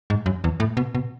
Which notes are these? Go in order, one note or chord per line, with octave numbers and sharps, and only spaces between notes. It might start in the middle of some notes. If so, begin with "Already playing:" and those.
G#2
F#2
E2
A2
B2
B2